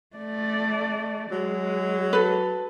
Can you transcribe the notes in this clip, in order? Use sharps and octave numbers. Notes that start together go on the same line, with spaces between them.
A3 D5
F#3 G#3
A4 B4